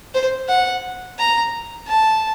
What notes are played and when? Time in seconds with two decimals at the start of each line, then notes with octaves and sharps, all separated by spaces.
0.14 C5
0.49 F#5
1.19 A#5
1.87 A5